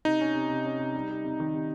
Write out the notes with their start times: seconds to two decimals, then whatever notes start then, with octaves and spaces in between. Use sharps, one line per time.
0.05 C3 D#4
0.21 C#4
0.35 C3
0.50 C3
0.65 C#4
0.80 C3
0.95 G3
1.10 G3
1.24 C3
1.40 D#3
1.54 C3